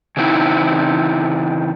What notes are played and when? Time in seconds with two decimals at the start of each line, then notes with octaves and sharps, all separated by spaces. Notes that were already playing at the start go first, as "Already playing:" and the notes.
0.17 C#3 E3 C4 D#4 E4